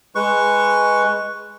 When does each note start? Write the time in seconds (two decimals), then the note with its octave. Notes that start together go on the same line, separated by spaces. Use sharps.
0.15 G#3 B4 C#6